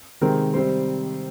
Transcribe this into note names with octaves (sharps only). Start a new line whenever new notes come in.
C3 D#3 G#3 C4 A#4
C3 G3 C4 C5